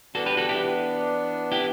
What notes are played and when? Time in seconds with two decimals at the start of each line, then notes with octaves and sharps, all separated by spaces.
0.15 E3 B3 D4 F#4 A4
0.26 G4 B4
0.37 F#4 A4
0.49 E4 G4
1.52 E4 G4